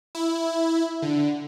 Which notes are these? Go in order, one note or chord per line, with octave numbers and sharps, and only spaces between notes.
E4
D3